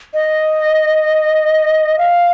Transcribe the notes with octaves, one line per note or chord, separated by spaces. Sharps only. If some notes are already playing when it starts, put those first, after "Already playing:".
D#5
F5